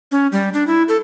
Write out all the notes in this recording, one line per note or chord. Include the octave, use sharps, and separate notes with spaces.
C#4
G3
D4
E4
A4